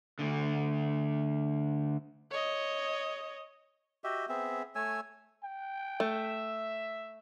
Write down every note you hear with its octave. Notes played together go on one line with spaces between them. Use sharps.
D2 D3
C#5 D#5
F#4 G4 D#5 E5
B3 C4 G#4 E5
A3 C#5 G#5 E6
G5
A3 E5